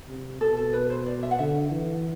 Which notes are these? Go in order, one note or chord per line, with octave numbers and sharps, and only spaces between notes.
C3
B2 A4
A4
B4
C5
D5
E5
F#5
D3 E5
E3